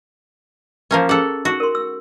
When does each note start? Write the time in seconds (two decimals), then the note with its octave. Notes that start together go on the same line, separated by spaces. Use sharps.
0.91 F3 A#3 C#4
1.09 C#4 G#4 A4 F#5
1.45 D#4 F#4 C#6
1.60 A#4 C6
1.75 E6